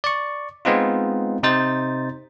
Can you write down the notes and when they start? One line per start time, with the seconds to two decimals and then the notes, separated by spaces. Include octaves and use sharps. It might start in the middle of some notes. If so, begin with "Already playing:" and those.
0.04 D5 C#6
0.65 G#3 B3 C4 D#4 F4
1.43 C3 D#4 C5 A6